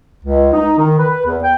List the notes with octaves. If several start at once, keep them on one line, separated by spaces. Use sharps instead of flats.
C#2
D#4
D#3
B4
E2
G5